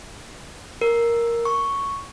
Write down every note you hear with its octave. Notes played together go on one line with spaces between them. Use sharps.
A#4
C#6